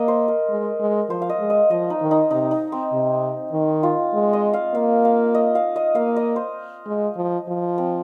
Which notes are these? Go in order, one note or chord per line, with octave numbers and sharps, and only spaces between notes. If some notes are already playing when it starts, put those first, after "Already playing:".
Already playing: A#3 D#5
C5
A#4
G#3
G#3
F3 C5
F5
D#5
G#3
D#5
F3 D#5
D#4
D#3
D#4
C3 D#4
D#4
C4
C3
D#3
F4
G#3
D#5
F5
A#3 F5
F5
D#5
F5
D#5
A#3 F5
D#5
C5
G#3
F3
F3
C4